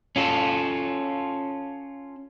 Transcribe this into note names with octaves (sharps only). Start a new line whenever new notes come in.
C#4 F4 A4